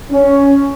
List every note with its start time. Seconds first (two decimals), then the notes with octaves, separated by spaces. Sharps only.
0.11 C#4